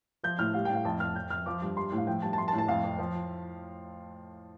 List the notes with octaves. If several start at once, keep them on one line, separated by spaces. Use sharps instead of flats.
F3 G6
A2 F6
G3 F5
A2 G5
F5
F2 A5
F2 F6
F2 G6
F2 F6
F3 D6
G2
G3 C6
A2
F5
F3 G5
G2 A5
A5
F3 C6
A5
A2
A5
F2 F5
F2
F3